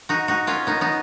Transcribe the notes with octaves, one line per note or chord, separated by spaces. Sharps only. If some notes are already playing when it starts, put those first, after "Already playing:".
D#4 F#4
D#4 F#4
C#4 F4
B3 D#4
B3 D#4